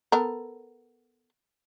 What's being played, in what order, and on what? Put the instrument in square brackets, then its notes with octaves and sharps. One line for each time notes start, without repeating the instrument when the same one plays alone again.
[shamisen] B3 A4 A#4